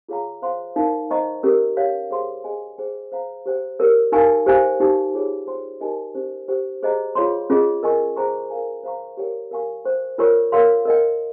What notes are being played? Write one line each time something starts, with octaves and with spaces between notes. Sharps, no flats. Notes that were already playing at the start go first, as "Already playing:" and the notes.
F4 G#4 C#5 F5 A#5
C5 F5 C6
D#4 A#4 F5
C5 D#5 A#5 C#6
C#4 G4 A#4
G4 C#5 F5
G#4 C5 F5 C6
G#4 D#5 G#5
G#4 C5 G5
C5 F5 A#5
G4 C5 G5
G4 A#4 C#5
D#4 A#4 F5 G#5 C#6
G4 C5 F5 G#5
D#4 G4 C5
F4 G#4 C#5
C5 G5 C6
D#4 G4 A#4 D#5 G#5
C#4 G4 C5
G4 C5 G5
G#4 C5 D#5 G5 A#5
F4 G#4 C#5 F5 C6
C#4 F4 G#4 D#5
A#4 D#5 G#5 C#6
G#4 C5 G5 A#5 C#6
A#4 F5 G#5
C5 F5 A#5 C#6
G4 A#4 C#5 G5
A#4 F5 G#5 C#6
C5 G5 C#6
F4 A#4 C#5 G5 C#6
A#4 C#5 F5 C6
A#4 D#5 G5